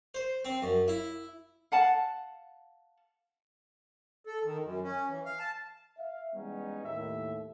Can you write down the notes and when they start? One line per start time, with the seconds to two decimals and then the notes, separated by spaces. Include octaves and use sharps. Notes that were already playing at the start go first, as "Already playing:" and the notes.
0.15 C5
0.45 C4
0.62 F#2
0.88 E4
1.72 F5 F#5 A5
4.25 A4
4.45 D#3
4.64 F#2
4.83 C#4
5.09 E3
5.25 F5
5.39 A5
5.97 E5 F5
6.34 E3 G3 G#3 B3 C#4 D#4
6.83 D#2 A2 E5